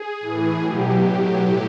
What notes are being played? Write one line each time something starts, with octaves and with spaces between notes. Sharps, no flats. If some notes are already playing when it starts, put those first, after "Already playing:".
Already playing: G#4
A2 E3
B2 F#3 G4
A2 F#3